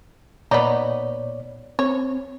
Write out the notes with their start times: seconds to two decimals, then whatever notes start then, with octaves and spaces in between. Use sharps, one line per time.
0.51 A#2 B3 D#4 C#5 D5
1.79 C4 C#5